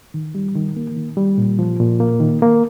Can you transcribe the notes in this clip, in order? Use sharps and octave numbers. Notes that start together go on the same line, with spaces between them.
D#3
G3
D#3
A#3
D#3
G3
A#2
F3
A#2
A#3
D#3
A#3